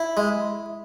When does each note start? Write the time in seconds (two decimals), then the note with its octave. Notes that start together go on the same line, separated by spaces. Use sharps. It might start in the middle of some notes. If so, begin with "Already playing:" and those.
Already playing: E4
0.17 G#3